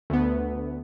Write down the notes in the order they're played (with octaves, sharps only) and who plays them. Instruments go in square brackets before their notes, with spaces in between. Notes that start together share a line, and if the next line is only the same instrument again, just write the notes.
[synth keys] D2 B3